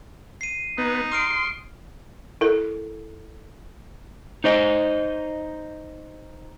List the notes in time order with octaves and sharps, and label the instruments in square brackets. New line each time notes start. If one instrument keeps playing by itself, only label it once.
[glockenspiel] C7 D#7
[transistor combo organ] B3 [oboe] D#4
[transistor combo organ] C6 [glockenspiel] D#6 F6 D7
[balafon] E4 A4 A#4
[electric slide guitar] D#4 C5 D#5